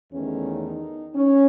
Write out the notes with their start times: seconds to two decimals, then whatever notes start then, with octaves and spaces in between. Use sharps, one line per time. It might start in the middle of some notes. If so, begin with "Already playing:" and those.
0.12 E2 D#3 A3 C#4
0.63 D#4
1.15 C#4